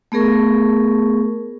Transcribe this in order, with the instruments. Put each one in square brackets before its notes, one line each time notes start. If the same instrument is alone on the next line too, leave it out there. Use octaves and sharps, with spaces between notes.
[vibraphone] A3 B3 G#4 A#4 C#6